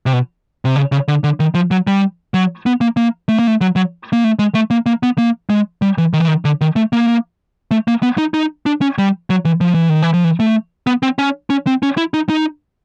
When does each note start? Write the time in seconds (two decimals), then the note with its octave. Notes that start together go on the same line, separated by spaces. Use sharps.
0.06 C3
0.13 B2
0.65 C3
0.76 C#3
0.92 C#3
1.08 D3
1.24 D3
1.40 D#3
1.54 F3
1.71 F#3
1.87 G3
2.34 F#3
2.66 B3
2.81 A#3
2.97 A#3
3.28 A3
3.39 A#3
3.47 A3
3.61 F#3
3.76 F#3
4.13 A#3
4.24 A3
4.39 G#3
4.55 A3
4.71 A#3
4.86 A#3
5.03 B3
5.18 A#3
5.50 G#3
5.82 G3
5.98 E3
6.13 D#3
6.20 E3
6.28 D#3
6.45 D3
6.61 D#3
6.76 A3
6.93 A#3
7.71 A3
7.88 A#3
8.03 B3
8.18 D#4
8.34 D#4
8.66 D4
8.81 C#4
8.98 G3
9.30 F#3
9.45 E3
9.61 F3
9.75 E3
9.89 D#3
10.03 E3
10.14 F3
10.24 E3
10.40 A3
10.87 B3
11.03 C4
11.19 C#4
11.50 C#4
11.67 C4
11.83 C#4
11.97 E4
12.14 D#4
12.29 D#4